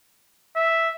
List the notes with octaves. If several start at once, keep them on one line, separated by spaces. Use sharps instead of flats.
E5